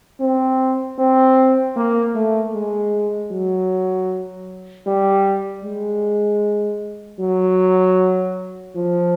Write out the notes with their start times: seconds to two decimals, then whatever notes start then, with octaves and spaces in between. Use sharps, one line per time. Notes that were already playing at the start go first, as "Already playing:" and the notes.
0.20 C4
0.98 C4
1.76 A#3
2.15 A3
2.54 G#3
3.31 F#3
4.87 G3
5.64 G#3
7.20 F#3
8.75 F3